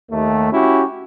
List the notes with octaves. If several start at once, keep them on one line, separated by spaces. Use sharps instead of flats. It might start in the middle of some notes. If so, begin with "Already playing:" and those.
D#2 A3
C#4 E4 F#4 G4